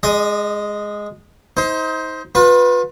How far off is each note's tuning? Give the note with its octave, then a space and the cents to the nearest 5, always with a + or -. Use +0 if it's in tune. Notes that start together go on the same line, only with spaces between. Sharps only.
G#3 +0 D#5 -45 D#6 +10
D#4 +35 C5 +0
F4 +35 B4 +0